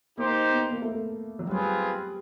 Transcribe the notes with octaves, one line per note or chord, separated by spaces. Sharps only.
A#3 D#4 G4 C5
B3
A#3
A3
F#3
G3 C4 F4 G#4 B4